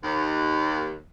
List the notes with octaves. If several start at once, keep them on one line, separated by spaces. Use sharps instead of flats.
D#2